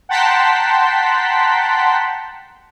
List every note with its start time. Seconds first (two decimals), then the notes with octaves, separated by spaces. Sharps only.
0.09 F#5 G5 A5 A#5 C6 B6